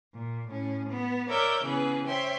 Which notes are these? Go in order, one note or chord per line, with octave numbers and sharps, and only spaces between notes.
A#2
A2 C#4
B3
A#4 C#5 D5 E5 D6 G6
C#3 E3 B3 C#4 G#4 B4
C5 C#5 E5 G5 C6